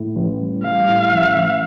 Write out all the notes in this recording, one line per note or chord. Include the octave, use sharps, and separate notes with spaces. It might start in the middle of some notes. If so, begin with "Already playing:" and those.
Already playing: A2
A1
G3
G3 F5
A2
A1
A1